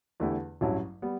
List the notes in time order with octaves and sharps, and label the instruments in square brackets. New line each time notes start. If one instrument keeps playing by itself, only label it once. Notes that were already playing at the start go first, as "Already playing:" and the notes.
[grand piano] E2 D3 A3 E4 G4
A1 G2 F#3 C#4 E4
G3 B3